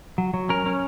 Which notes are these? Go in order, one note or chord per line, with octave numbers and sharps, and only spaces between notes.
F#3
F#3
C#4 A#4
C#4